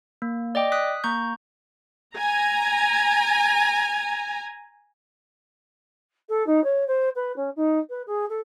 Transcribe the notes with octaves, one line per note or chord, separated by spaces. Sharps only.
A#3
D5 D#5 G5 D6
D#6 F#6 B6
A#3 A#5 C#6 G6
G#5 A#5
A4
D#4
C#5
C5
B4
C#4
D#4
B4
G#4
A4